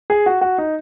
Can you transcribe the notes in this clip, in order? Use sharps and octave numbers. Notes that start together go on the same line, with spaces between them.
G#4
F#4
F#4
D#4